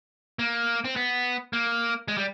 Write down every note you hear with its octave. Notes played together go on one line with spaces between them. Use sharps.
A#3
C4
B3
A#3
G#3
G3